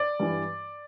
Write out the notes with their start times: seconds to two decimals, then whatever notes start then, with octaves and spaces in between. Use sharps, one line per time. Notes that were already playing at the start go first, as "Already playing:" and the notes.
Already playing: D5
0.20 G2 E3